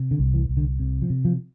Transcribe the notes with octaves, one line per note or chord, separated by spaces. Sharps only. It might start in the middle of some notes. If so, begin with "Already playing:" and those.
Already playing: C3
D3
C2
E3
C2
D3
C3
F3
C3
F3